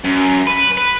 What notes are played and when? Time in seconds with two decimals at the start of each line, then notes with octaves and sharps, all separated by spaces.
0.04 F#2
0.47 B4
0.78 B4